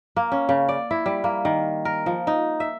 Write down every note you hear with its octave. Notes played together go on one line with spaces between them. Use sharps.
A#3
C#4
C#3
D5
E4
G3
A#3
D#3
A#4
F3
D#4
E5